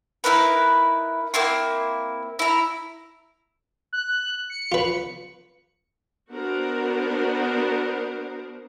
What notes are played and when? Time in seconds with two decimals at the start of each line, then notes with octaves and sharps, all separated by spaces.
0.24 D#4 E4 A#4 B4
1.34 A#3 C4 E4 C6
2.39 E4 A#5
3.93 F#6
4.50 C#7
4.72 F4 B4
6.32 B3 D4 F#4 A#4 C5